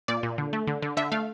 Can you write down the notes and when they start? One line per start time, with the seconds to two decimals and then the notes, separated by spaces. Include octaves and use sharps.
0.08 A#2 D5
0.23 A#2
0.38 D3
0.53 A3
0.67 D3
0.82 D3
0.97 D3 E5
1.12 A3 F5